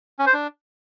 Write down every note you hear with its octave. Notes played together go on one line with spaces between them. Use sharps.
C#4
C5
D4